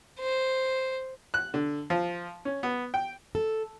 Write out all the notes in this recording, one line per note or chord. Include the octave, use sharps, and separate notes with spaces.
C5
F#6
D3
F3
C#4
B3
G5
A4